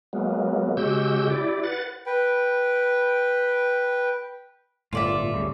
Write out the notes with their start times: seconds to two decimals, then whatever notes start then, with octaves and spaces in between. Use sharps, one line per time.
0.13 F#3 G#3 A#3 B3
0.77 C#3 G#3 F#4 G4 E6 G6
1.30 E4 G4 D5
1.63 B4 F#5 A6
2.06 B4 G5
4.93 G1 A2 F4 A4 D5 E5
5.21 A2
5.34 D2 C#3 G3